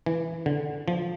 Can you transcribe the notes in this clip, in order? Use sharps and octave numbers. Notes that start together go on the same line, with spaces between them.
E3
D3
F3